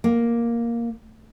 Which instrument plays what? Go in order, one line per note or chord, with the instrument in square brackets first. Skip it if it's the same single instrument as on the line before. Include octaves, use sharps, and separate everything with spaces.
[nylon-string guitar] A#3